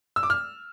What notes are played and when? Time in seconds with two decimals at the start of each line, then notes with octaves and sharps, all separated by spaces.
0.16 E6
0.23 D6
0.30 F6